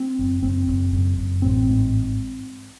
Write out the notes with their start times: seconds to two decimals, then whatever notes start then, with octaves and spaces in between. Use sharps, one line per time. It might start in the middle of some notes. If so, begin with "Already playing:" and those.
Already playing: C4
0.19 F#1
0.42 F#1 C4
0.68 F#1
0.93 F#1
1.17 F#1
1.42 A1 C4
1.67 G#2